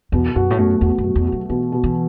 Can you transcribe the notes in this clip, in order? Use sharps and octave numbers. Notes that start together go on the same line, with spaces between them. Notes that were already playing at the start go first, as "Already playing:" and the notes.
E2 B2
F#2 F#4
A2
F#2 A3
E2 F#4
F#2
B2
E2
F#4
F#3
B2 E3
B2
E3